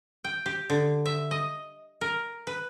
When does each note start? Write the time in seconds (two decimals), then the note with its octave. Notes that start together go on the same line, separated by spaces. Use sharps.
0.24 G5
0.46 G4
0.70 D3
1.05 E5
1.31 D#5
2.01 A#4
2.47 B4